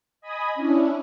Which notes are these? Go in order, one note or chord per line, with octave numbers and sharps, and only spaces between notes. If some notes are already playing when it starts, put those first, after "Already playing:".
D#5 G#5 B5 D#6
C#4 D4 E4